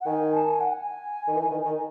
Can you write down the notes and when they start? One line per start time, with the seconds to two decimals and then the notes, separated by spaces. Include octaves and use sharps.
0.01 F#5
0.06 D#3 G#5
0.35 A5
0.47 G#5
0.60 F#5
0.74 G#5
1.27 D#3
1.36 E3
1.51 D#3
1.65 D#3